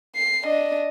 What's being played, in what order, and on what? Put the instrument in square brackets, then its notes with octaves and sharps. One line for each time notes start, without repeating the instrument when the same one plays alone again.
[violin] C7
D4 D#5